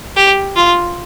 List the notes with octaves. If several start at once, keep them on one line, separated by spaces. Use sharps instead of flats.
G4
F4